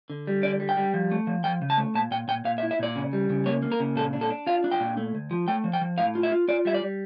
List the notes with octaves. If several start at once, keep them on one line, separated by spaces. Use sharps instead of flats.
D3
G3
D3 D5
G3
G5
G3
F3
A3
F3
F3 G5
C#3
A5
A3
A#2 A5
A#2 G5
A#2 G5
A#2 F5
E5
E4
E5
A#2 D5
C#3
G3
C#3
A#3 C#5
A#3
A#4
C#3
A#2 A4
D4
A4
D4
F4 F5
D4
G5
A#2
A3
D2
F3
A3 G5
F3
G5
F3
A2 F5
F4
E5
F4
F4 D5
G3 E5
D5
G3